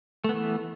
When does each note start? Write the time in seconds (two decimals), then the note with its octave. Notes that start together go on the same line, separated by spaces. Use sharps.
0.24 A3
0.29 B3
0.34 E3